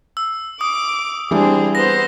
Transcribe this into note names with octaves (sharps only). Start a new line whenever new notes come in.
E6
D6 D#6
E3 G3 C4 D4 G#4
B3 C5 A#6